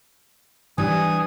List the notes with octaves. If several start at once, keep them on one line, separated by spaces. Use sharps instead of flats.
E3 G3 D4 G#5 D#6